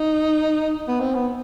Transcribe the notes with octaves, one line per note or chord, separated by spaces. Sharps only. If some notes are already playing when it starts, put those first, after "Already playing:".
Already playing: D#4
B3
C4
B3